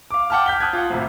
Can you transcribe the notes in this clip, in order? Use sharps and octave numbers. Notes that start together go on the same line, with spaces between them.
F5 D6
F#5 G5 A5 D6 F6
F6 G6 B6 G7
A5 D#6 F#6 G#6
F4 F#5
G#1 A2 C3